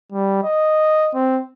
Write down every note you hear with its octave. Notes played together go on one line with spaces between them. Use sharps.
G3
D#5
C4